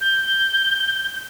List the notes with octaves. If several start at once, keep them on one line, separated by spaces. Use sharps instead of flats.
G6